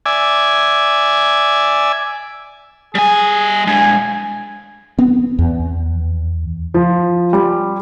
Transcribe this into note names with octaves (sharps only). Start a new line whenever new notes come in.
D5 E5 G#5
G3 G#4 G#5
G#3 D4 G#5
B3 C4
E2
F3
G3